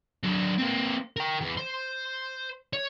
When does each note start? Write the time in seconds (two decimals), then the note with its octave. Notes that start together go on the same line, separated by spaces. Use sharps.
0.23 F#3 D4
0.58 A#3 C4
1.17 A#4 G5
1.41 E2
1.57 C5
2.73 C#5